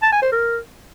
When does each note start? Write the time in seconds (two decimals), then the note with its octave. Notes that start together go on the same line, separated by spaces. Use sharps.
0.03 A5
0.12 G#5
0.22 C5
0.32 A#4